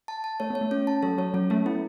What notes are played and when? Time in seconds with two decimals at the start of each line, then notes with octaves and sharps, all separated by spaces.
0.08 A5
0.24 A5
0.40 A3 C#5
0.50 B3 C#5
0.61 A3
0.71 C#4
0.87 A5
1.03 F#3 A4
1.18 F#3 C#5
1.34 F#3 C#4
1.50 A3 A4
1.66 B3 E4